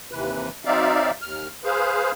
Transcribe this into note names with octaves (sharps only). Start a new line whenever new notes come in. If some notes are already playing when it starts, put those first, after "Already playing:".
D#2 C3 E3 B4
F#3 C4 D#4 D5 E5 F5
D#2 F6
G#4 B4 C5 F5